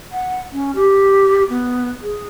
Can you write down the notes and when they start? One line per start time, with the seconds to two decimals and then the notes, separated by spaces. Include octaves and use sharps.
0.12 F#5
0.53 C#4
0.75 G4
1.49 B3
2.02 G#4